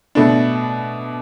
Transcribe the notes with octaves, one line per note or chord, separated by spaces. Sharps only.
B2 A3 D4